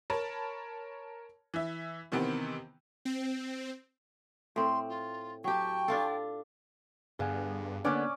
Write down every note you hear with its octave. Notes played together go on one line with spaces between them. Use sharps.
A#4 C#5 A5 B5
E3 E5
C3 D#3 E3 B3 C4
C4
A2 C4 C6
F4
F#3 G4 G5 A5 C#6
D4 F4 A4
G2 D3 B3 G#4 F5 G#5
D3 A#3 B3 C#4 D4 D5